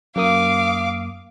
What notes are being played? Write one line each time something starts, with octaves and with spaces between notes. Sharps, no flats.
F#2 A#3 F5 D6 D#6